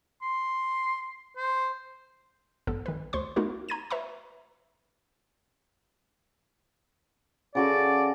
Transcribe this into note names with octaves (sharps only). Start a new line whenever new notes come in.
C6
C5
A1 G2 B3 A4
D#3 B4
D2 C5 C6 C#6
A3 B3 D#4 F4 F#4 A#4
A#5 G#6 D#7
B4 E5 A#5 C#6
C#3 F#4 A4 D5